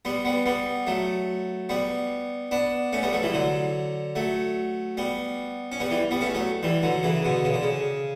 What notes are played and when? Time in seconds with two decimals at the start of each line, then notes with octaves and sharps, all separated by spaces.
0.05 G3 B3
0.25 G3 B3
0.46 G3 B3
0.87 F#3 A3
1.69 G3 B3
2.51 B3 D4
2.93 A3 C#4
3.02 G3 B3
3.13 F#3 A3
3.23 E3 G3
3.34 D3 F#3
4.16 F#3 A3
4.97 G3 B3
5.72 C#4
5.80 G3 B3
5.90 E3 G3
6.11 G3 B3
6.21 A3 C#4
6.35 F#3 A3
6.63 E3 G3
6.83 D3 F#3
7.03 C#3 E3
7.25 B2 D3
7.45 C#3
7.54 D3
7.63 C#3